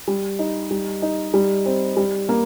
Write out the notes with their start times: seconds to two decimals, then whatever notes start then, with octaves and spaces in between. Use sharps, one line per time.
0.08 G3
0.39 D#4
0.71 G3
1.02 D#4
1.34 G3
1.66 C4
1.97 G3
2.29 A#3